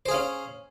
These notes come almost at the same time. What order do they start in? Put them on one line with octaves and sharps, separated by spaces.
C5 G#4 F5 C#4